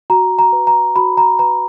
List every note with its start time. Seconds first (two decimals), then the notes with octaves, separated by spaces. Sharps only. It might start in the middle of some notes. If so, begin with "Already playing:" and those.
0.10 F#4 A#5
0.39 A#5
0.53 B4
0.67 A#5
0.96 F#4 B5
1.17 A#5
1.39 B4 A#5